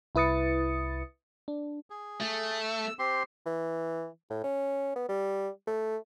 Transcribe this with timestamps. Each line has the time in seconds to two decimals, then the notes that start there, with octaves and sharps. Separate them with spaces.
0.15 C2 E4 B4 D#6 A6 C#7
1.48 D4
1.90 G#4
2.21 A3
2.61 E6
2.99 C4 G4 C6
3.46 E3
4.30 A2
4.44 C#4
4.96 B3
5.09 G3
5.67 A3